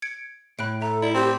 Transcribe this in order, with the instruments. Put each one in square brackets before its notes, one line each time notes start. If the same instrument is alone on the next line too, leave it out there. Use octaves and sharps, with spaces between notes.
[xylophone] G#6 C#7 D7
[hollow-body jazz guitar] A2 [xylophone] B5 F#6 D7
[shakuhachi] A4 [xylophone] E5 A#5
[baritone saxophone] E4 [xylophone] D5
[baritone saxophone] C4 [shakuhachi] G4